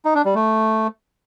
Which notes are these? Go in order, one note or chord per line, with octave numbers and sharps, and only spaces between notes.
D#4
D4
G3
A3